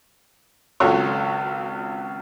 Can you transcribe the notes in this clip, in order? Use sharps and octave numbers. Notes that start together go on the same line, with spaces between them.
G#1 C#2 F#3 F4 A4 C#5